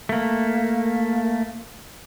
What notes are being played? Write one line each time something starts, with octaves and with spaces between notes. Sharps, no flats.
A3 A#3